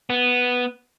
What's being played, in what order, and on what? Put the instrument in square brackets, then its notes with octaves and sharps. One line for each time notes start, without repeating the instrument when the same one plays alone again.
[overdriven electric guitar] B3